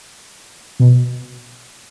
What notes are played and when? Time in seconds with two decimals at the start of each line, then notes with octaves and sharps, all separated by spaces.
0.80 B2